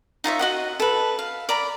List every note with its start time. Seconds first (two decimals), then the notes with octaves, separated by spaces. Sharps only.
0.24 D#4 F4 C#5 E5
0.39 F#4 D#5 F#5
0.80 A4 B4
1.19 F5
1.49 D5 A#5 B5